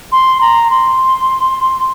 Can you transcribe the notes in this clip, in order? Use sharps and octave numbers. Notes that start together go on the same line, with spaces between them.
C6
A#5
C6